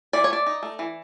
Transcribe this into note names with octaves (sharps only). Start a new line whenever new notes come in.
E3 D5
C#5
A3 D5
D#4
A3
E3